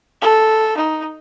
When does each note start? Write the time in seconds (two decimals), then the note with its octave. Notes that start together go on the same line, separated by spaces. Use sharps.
0.22 A4
0.77 D#4